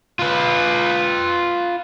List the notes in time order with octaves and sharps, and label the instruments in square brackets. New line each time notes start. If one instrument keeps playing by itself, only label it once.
[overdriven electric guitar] F4 B4